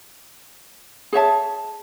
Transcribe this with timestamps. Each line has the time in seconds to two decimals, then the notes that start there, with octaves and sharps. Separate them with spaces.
1.13 G#4 C#5 E5 A5